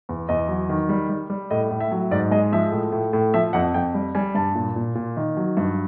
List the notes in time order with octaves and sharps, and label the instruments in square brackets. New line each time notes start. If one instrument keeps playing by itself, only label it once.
[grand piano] E2
E2 D#5
F#3
D#3
G3
G3
G3
A2 D#5
A2
E5
F#3
G#2 D5
G#3 D#5
F3 E5
A2
A2
A2
F3 E5
F2 F#5
F2 G5
G3
G3 G#5
G2 A5
A#2
A#2
A#2
D#3
F#3
G2